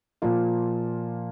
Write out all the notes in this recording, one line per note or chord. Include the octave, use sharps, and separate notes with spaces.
A#2 F3 A#3 F4